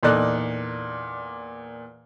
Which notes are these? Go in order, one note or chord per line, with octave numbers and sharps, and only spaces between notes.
E2 A#2 D#4 A4 D5 F#6